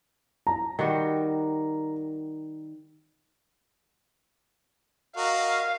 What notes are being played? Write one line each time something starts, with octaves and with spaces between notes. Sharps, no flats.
A#5
D#3 G3 F#4
F#4 A#4 D#5 F5